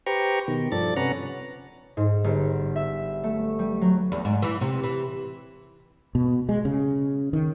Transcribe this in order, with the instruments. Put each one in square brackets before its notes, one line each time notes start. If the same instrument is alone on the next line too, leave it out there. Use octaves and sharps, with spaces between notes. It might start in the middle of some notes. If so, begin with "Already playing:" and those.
[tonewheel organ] G4 B4 C5 G5 A#5 C#6
B2 D#3
G2 F3 A4 D5 A6
C3 C#4 B4 C#5 F#5 A#5
[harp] G#2
G1
E5
A3
G3
F#3
[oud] E2
G#2
E3
C3
E3
[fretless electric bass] B2
G#3
C#3
D#3